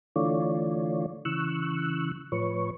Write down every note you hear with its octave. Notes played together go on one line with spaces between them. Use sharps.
D3 E3 A3 F4 C#5 D5
C#3 E3 C#6 E6 F#6
A2 F3 B4 C#5 C#6